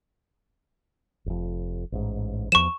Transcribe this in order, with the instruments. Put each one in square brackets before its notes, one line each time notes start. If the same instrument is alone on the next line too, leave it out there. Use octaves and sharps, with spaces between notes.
[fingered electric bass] F1 F2
A1 G#2
[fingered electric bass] E2 F3 [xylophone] C#6 E7